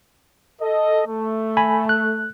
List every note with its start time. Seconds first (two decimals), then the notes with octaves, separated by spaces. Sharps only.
0.62 A4 D#5
1.07 A3
1.57 G#5 B5
1.89 F#6